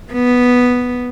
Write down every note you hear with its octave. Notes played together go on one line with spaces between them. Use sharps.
B3